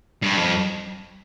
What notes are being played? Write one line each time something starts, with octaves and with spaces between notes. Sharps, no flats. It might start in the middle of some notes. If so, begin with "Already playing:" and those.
G2
F2